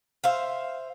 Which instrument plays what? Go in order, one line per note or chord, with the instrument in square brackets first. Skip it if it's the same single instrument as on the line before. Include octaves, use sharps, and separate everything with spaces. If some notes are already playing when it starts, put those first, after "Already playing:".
[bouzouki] C5 E5 F5